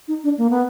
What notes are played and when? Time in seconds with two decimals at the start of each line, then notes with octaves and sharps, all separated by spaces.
0.08 D#4
0.24 D4
0.38 A#3
0.50 B3